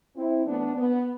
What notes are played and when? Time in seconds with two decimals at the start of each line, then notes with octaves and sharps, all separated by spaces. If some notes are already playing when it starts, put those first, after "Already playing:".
0.15 C4 E4
0.46 A2 E3 A3 B3 D4
0.76 B3